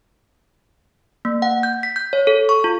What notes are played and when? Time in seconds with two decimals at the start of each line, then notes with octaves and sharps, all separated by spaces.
1.25 A#3
1.42 F#5
1.63 G6
1.83 B6
1.96 G6
2.13 C#5
2.27 A4
2.49 C#6
2.64 F4